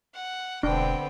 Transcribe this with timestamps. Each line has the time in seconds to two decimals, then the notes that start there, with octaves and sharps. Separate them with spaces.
0.15 F#5
0.63 E1 D3 B3 C4 D4 G5